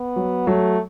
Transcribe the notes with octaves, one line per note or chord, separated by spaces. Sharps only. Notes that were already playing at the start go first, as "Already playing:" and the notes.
Already playing: B3
F#3
F#3 A3